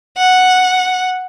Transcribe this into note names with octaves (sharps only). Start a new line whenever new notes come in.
F#5